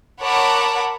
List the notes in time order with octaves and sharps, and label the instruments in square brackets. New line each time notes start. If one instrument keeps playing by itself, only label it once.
[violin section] A#4 C#5 F#5 A5 B5 D6